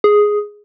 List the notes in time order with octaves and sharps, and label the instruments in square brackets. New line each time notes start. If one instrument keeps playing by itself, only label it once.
[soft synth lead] G#4